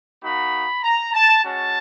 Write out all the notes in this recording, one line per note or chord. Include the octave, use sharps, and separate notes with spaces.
A#3 D#4 F#4 B5
A#5
A5
G#3 C#4 F#4 A5